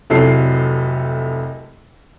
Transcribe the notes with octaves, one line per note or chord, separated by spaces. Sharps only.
F1 C2 F#3 A4 C7